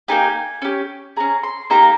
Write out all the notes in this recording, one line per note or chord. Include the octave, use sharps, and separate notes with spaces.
A#3 D#4 G4 G#5
C#4 G4
C#4 G#4 A#5
C6
A#3 D#4 G4 A#5